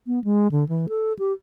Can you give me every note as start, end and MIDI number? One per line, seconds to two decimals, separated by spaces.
0.07 0.22 59
0.24 0.48 56
0.51 0.67 50
0.69 0.86 52
0.89 1.13 69
1.19 1.32 67